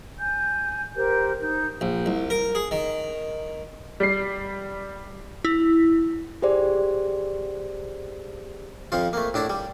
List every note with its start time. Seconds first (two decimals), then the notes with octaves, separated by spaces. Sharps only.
0.19 G#5 G6
0.96 G4 A#4 C5 G6
1.41 D#4 G6
1.81 A#1
2.06 C2
2.30 A#4
2.55 G#4
2.71 D#3
4.00 G3 C7
5.45 E4
6.42 G4 G#4 C5 D5
8.92 F2 F3 F4
9.13 A3 A#3
9.34 A2 D4 E4 A5
9.50 G3